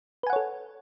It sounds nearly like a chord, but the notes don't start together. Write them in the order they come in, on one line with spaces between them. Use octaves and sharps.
B4 G#5 F#5 C#5 A4